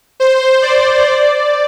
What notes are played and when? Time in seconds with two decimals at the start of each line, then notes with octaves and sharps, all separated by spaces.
0.20 C5
0.62 D5
1.05 D5